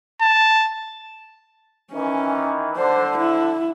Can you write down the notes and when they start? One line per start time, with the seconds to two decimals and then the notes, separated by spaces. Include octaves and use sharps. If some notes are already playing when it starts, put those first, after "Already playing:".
0.22 A5
1.93 D#3 E3 C#4
2.77 D3 C5
3.18 E4